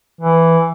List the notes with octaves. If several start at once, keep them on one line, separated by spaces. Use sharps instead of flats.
E3